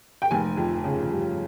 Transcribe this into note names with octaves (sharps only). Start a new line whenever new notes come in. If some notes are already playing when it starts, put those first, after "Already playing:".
G5
F1 G#5
F2
C#3
G3